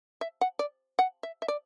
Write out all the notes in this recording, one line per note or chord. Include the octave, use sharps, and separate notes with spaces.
E5
F#5
D5
F#5
E5
E5
D5